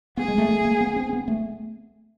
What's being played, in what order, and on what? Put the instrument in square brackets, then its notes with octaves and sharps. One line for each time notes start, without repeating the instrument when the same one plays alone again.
[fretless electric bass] B3 [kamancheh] G#4
[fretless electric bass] G#3
A3
A3
A#3
B3
C4
B3
A3